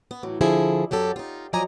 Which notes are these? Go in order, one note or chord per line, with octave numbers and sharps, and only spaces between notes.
B3
A2 E3 F#3
D3 F3 E4 G#4
F#2 F#3 G4 A4
D#4 F4
F3 F#3 D5 D#5 G#5 A#5